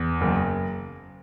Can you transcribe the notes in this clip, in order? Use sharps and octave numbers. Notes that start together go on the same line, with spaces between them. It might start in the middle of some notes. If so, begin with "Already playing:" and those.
Already playing: E2
F#1